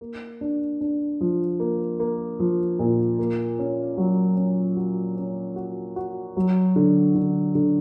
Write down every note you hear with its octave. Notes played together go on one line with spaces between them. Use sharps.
A#3
D4
D4
F3
A#3
A#3
F3
A#2
A#3
C#4
F#3
C#4
F#4
C#4
F#4
F#4
F#3
D3
D3
D3